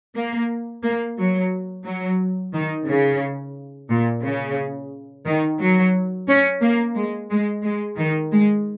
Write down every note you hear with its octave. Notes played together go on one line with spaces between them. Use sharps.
A#3
A#3
F#3
F#3
D#3
C#3
A#2
C#3
D#3
F#3
C#4
A#3
G#3
G#3
G#3
D#3
G#3